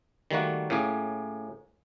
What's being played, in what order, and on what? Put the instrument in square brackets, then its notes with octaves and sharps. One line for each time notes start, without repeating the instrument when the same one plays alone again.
[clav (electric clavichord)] D#3 G3 A3 A#3 F#4
A2 A#3 C#4 G4 G#4